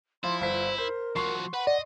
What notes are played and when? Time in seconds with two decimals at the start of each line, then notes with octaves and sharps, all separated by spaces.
0.24 F3 E4 C6
0.41 G1 F4 C5 B6
0.78 A#4 C5
1.16 F3 F#4 C6 C#6 C7
1.53 B4 F#5 B5
1.67 D5 D#5